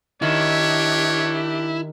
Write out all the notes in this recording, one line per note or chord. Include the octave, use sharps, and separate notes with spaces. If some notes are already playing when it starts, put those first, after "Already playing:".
D#3 D4 E4 G4 C#5